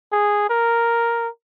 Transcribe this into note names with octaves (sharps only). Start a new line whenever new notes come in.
G#4
A#4